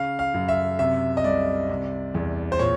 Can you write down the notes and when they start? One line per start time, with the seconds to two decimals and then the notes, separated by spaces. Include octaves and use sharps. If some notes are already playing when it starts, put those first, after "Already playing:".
Already playing: C#3 F5
0.19 F5
0.34 F#2
0.48 E5
0.79 C3 E5
1.17 D#5
1.24 C2 D5
1.69 C3
2.15 E2
2.52 C5
2.59 A#2 C#5